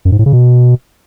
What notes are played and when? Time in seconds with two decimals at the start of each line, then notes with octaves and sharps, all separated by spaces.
0.05 F#2
0.12 G#2
0.19 A2
0.26 C#3
0.33 B2